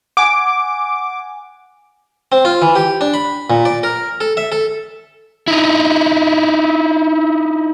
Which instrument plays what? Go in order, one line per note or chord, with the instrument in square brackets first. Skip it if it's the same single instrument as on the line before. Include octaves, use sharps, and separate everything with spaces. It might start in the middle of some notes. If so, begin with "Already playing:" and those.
[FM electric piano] F#5 G#5 [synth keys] D6
[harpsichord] C4
F4
E3
G4
D4
B5
A#2
D5
A#4
A4
E5
A4
[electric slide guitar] D#4 E4